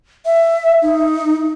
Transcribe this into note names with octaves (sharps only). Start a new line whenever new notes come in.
E5
D#4